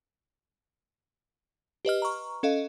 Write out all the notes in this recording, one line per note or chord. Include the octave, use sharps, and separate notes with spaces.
G4 B4 D#5 F6
A#5 C#6
C#4 A4 D#5 F5